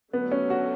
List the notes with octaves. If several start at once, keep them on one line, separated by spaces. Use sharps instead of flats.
D3 F#3 A3 B3 D4
C#4
F#4